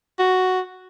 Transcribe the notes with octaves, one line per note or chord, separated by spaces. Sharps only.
F#4